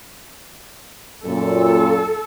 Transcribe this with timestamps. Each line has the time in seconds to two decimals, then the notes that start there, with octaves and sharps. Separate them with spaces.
1.26 F#2 A#2 A4